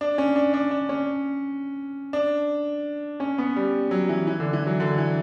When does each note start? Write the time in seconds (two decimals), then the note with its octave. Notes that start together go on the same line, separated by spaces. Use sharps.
0.01 D4
0.18 C#4
0.36 D4
0.54 D4
0.71 D4
0.89 C#4
2.13 D4
3.20 C#4
3.38 B3
3.56 G3
3.91 F#3
4.09 E3
4.27 E3
4.40 D3
4.53 E3
4.67 F#3
4.80 D3
4.98 E3